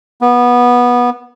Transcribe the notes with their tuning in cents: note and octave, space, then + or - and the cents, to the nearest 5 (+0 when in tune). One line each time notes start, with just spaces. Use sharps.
B3 -15